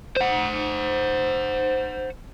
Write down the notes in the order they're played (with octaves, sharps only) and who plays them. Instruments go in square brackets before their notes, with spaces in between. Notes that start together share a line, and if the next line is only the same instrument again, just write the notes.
[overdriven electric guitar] C5 F#5